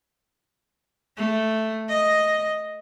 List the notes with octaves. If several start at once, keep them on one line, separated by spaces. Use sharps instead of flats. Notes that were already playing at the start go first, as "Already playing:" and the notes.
A3
D#5